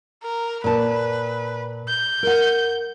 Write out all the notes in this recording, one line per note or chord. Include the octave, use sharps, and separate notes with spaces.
A#4
A#2 B4 A5
G6
A#4 F#5